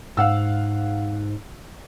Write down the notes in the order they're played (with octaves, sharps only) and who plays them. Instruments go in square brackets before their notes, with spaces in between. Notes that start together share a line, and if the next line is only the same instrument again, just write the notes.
[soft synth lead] G#2 [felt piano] F5 F#5 E6